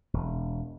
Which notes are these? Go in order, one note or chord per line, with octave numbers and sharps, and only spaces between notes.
E1